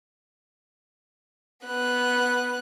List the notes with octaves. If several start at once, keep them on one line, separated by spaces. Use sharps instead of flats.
B3 F#6